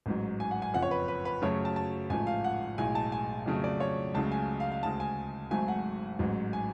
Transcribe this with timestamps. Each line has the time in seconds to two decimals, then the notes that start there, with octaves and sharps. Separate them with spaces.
0.06 A1 G#2 F#3
0.40 G#5
0.51 F#5
0.62 G#5
0.74 F#1 F2 F3 F#5
0.82 C#5
0.91 B4
1.08 B4
1.25 B4
1.42 F#2 C#3 F#3 A3 C#5
1.65 A5
1.76 A5
2.10 A1 G#2 F3 A3 G#5
2.27 F5
2.44 F#5
2.78 B1 A2 G#3 G#5
2.95 A5
3.12 G#5
3.46 F2 C#3 F#3 A3
3.64 D5
3.80 C#5
4.14 C#2 C#3 F#3 A3 A5
4.32 G#5
4.60 F5
4.72 F5
4.83 D2 C#3 G#3 A5
5.00 G#5
5.51 G#1 G#2 F#3 A3 G#5
5.68 F#5
6.19 A1 G#2 F#3
6.53 G#5